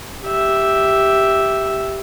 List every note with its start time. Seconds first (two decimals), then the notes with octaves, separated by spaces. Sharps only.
0.25 G4 E5